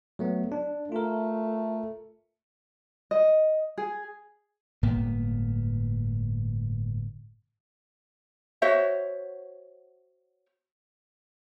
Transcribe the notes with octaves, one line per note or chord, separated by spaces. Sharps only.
F#3 A3 B3
D4
A3 F4 A#4
D#5
G#4
G1 A2 A#3 B3
F#4 C5 C#5 E5